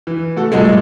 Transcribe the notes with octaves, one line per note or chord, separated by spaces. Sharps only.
E3
A3 F#4 A4
G2 A#2 F3 F#3 G#3 A3